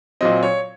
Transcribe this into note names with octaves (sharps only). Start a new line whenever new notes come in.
A#2 F#3 C4 D#5
C#5